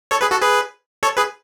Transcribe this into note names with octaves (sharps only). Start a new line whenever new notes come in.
A4 C#5
G#4 B4
F#4 A4
G#4 B4
A4 C#5
G#4 B4